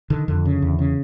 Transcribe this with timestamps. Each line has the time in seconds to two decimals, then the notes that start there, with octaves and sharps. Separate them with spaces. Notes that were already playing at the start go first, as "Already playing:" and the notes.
0.10 D3 D#3
0.28 F2 D3
0.45 C#3
0.62 E2
0.79 C#3